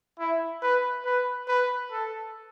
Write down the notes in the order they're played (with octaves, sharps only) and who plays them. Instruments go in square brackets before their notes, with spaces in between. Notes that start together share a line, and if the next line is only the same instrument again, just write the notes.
[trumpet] E4
B4
B4
B4
A4